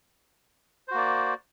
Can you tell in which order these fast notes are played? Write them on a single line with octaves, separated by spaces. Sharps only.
C5 F#4 A#3 D5